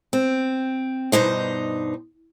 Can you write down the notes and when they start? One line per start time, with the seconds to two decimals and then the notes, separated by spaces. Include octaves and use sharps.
0.13 C4
1.12 G2 B2 D#4 C5